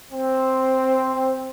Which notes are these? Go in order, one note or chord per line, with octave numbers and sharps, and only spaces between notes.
C4